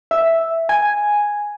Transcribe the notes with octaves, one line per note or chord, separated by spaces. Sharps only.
E5
G#5